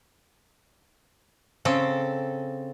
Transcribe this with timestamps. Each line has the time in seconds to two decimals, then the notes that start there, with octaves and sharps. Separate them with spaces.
1.65 C#3 C4 A4